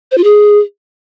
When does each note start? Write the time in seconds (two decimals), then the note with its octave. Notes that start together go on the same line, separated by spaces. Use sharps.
0.12 C5
0.18 F4
0.24 G#4